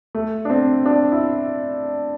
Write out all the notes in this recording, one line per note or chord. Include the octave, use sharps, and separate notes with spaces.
A3
D4
C4
D4
E4